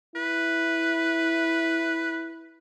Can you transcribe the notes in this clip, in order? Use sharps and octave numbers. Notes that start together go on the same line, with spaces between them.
E4 B4